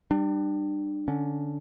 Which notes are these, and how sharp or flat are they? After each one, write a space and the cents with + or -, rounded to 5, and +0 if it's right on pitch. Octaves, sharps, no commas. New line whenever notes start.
G3 +0 D4 +35
D3 +0 C#4 +10